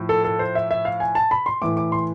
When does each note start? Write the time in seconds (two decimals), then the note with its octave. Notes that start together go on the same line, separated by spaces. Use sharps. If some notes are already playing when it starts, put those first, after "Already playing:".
Already playing: A2 F3
0.09 A4
0.24 A4
0.39 C5
0.55 E5
0.71 E5
0.85 F5
1.00 G#5
1.15 A5
1.31 B5
1.46 C6
1.62 A2 E3 D6
1.77 D6
1.92 C6